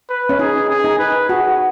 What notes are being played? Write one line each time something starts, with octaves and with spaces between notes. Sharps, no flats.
B4
C#4
D#4 G#4
G#4
D#4
B4
F#4 G#4